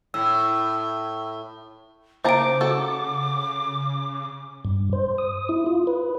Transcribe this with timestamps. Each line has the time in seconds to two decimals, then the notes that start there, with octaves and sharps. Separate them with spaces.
0.14 A2 E6
2.25 C#3 A#3 C5 A5 A#5 D6 D7
2.61 F#4 A4 A5
4.65 G2
4.93 C5
5.18 D#6
5.49 E4
5.66 F4
5.87 B4